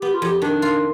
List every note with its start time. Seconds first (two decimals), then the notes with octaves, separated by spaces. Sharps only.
0.01 B3 G4
0.14 F4
0.22 F2 G4
0.42 D#3 D4
0.62 F4